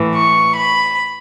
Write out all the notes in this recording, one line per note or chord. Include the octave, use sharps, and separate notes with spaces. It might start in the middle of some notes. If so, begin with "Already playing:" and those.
Already playing: A2 E3
C#6
B5